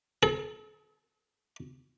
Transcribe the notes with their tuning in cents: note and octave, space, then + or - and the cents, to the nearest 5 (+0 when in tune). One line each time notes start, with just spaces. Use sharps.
A4 -45